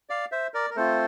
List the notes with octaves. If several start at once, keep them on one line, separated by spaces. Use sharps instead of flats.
D5 F5
C5 E5
A#4 D5
A#4
A3 C4 F4 A4 C5